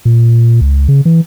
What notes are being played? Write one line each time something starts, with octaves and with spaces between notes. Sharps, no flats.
A#2
C#2
C#3
E3